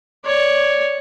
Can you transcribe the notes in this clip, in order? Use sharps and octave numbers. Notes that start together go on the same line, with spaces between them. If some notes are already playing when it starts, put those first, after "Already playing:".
C#5 D5